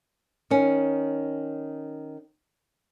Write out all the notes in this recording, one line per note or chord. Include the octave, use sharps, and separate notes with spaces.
D#3 C#4